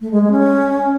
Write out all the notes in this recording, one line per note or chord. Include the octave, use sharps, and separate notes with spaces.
A3
G#3
G#3
C#4